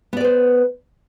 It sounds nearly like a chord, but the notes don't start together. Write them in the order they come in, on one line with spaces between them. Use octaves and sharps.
B3 D5 B4 C5